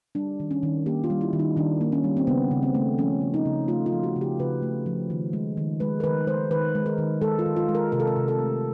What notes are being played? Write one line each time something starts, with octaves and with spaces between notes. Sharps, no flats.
G3 D4
D#3
C#4
D#3
A#3 G4
F4
G3
E4
D#3
D#4
D#3 D4
A#3
C#4
G3
C4
C#3 B3
C#3
C4
A3
F3 C#4
C#3
D#4
C#3
A3 F4
F4
F3
F#4
C#3
G4
C#3 B4
A3
F3
D#3
G#3
D#3
G#3 B4
A#4
D#3 B4
G#3 C5
D#3 B4
G#3
A#4
D#3
G#3 A4
F4
D#3
F4
G#3
A#4
C3 A#4
A4
A#4
C3
A4
A3